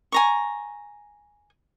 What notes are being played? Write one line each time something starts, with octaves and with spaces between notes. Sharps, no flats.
G#5 A#5 C#6